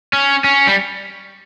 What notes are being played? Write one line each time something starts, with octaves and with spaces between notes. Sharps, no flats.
C#4
C#4
G3